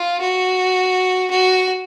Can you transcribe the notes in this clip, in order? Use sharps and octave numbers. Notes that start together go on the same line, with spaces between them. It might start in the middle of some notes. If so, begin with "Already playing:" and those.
Already playing: F4
F#4
F#4